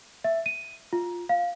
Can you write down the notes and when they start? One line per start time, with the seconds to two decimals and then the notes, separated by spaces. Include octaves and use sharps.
0.24 E5
0.46 D#7
0.93 F4
1.29 F5